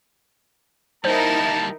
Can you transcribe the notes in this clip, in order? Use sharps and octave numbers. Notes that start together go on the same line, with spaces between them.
G3 A#3 D#4 E4 A#4 C5 A5